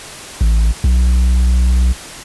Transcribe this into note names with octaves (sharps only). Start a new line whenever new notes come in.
A1
B1